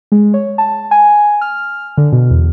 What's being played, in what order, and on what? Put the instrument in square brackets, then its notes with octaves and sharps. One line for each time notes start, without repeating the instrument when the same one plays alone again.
[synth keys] G#3
C#5
A5
G#5
F6
D3
B2
E2